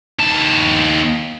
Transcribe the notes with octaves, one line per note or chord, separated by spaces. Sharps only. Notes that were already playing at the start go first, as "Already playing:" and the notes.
D#2 A5